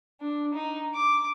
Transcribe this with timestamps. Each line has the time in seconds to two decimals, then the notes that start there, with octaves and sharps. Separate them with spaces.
0.21 D4
0.54 D#4
0.95 D6